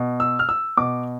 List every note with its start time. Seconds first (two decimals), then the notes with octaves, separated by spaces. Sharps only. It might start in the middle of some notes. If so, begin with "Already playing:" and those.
Already playing: B2
0.20 E6
0.39 F6
0.49 E6
0.77 B2 D6